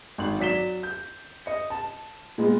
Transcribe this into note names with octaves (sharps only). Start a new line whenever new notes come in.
G#1 F#7
F#3 D5 B6 E7 G7
G6
D#5 C#7
A5
A#2 G#3 B3